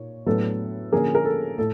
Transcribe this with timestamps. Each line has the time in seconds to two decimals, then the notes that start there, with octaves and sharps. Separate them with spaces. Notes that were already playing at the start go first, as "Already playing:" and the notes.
Already playing: A#2 A#3 D#4 C#5
0.26 A2 F#3 B3 D4 A4 B4
0.92 D3 F3 A#3 C#4 G#4 A#4
1.15 A#4
1.25 A4
1.58 A2 A4